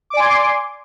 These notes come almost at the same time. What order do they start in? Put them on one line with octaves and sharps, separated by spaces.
D6 D5 G#5 C6